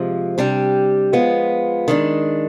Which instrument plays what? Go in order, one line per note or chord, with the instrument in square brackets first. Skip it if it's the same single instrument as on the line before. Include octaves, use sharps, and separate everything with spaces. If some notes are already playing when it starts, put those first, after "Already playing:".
Already playing: [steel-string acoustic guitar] C3 F3 G#3
C3 G3 D4 G4
F3 G#3 B3 F4
D#3 G#3 D4